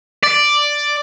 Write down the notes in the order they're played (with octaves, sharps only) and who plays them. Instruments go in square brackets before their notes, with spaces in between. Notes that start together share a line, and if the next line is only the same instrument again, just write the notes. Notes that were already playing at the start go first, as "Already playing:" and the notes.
[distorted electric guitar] D5